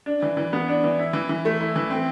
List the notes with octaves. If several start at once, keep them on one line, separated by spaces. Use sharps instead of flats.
D4
E3
E3
B3
D4
E3
E4
E3
E3
A3
E4
E3
C4